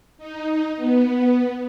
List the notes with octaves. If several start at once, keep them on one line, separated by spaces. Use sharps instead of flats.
D#4
B3